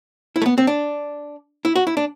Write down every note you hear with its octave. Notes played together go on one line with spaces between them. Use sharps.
E4
A3
B3
C4
D4
E4
F#4
E4
D4